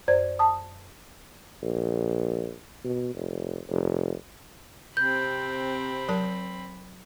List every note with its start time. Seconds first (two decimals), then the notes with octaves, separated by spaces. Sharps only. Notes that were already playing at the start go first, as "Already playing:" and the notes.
0.08 F#2 C5 D5 G#6
0.39 A5 D#6
1.62 A#1
2.84 B2
3.14 F1
3.69 F1
4.97 C3 C4 B5 G6
6.09 F#3 A#4 A5